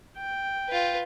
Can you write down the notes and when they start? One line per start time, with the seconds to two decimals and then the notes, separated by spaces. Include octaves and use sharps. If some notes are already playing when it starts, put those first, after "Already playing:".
0.17 G5
0.68 F4 B4